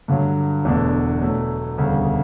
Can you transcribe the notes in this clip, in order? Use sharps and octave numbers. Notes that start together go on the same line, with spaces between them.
G2 D3 F#3
E1 E2 B2 A3 D4
B2 F#3 A3
E1 D2 C#3 G3